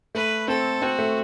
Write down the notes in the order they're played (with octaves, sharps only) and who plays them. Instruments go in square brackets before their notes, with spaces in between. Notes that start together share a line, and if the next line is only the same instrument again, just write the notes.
[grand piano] A3 [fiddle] B4
[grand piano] C4 [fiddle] A4
[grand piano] C4 [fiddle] F#4
[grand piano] A3